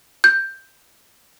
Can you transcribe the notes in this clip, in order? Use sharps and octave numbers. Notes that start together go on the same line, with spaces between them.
G6